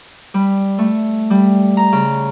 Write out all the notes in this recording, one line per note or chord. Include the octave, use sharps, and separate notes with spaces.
G3
A3
G3
A#5
C#3